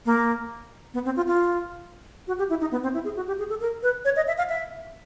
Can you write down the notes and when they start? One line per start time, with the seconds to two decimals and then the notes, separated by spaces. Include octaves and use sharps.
0.06 A#3
0.94 B3
1.05 C4
1.16 F4
1.27 F4
2.27 F#4
2.38 G4
2.50 E4
2.61 D#4
2.71 B3
2.83 C4
2.94 E4
3.05 G#4
3.16 F#4
3.27 G4
3.39 G#4
3.49 A4
3.61 A#4
3.83 B4
4.05 C#5
4.16 D#5
4.27 E5
4.38 F5
4.49 E5